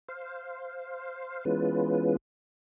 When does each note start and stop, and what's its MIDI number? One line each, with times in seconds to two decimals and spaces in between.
0.09 1.44 72
0.09 1.44 77
1.45 2.16 52
1.45 2.16 56
1.45 2.16 59
1.45 2.16 61
1.45 2.16 65
1.45 2.16 71